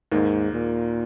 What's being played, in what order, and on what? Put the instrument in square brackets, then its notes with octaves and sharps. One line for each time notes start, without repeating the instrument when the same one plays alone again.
[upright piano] D#2 D#3 A#3 [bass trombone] G#2
[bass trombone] A#2